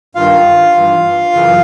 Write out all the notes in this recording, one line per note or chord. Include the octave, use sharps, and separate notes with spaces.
G2 D#3 F4 F5
G2 E3
F#2 C#3 E3